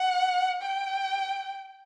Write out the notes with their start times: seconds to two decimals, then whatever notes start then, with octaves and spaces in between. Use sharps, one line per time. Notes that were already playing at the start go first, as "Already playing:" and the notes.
Already playing: F#5
0.62 G5